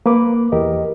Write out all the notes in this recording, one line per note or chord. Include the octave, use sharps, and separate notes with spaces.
A#3 B4 D6
E2 G4 A#4 D#5